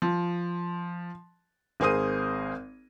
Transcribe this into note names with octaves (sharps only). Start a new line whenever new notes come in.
F3
G#1 G#4 A#4 C5 D#6 D#7